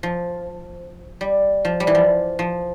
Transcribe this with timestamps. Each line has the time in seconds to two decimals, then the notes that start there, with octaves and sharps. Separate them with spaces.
0.03 F3
1.21 G3
1.65 F3
1.80 G3
1.87 E3
1.95 F3
2.39 F3